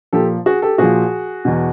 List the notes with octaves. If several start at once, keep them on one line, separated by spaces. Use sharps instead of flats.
A#2 F3 G4 A4
F#4 G#4
G4 A4
A#2 F3 F#4 G#4
E2 B2